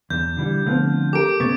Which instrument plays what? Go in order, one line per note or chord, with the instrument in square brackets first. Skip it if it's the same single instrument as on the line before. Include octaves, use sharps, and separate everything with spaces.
[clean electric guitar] E2 [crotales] G6
[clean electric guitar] D3 E3 G3
[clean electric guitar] D3 F3 F4 [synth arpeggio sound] A3 B3 C4
[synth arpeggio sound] G4 A4 A#4 [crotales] D6 D7
[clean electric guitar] C#3 B3 [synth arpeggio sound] C#6 G#6 A6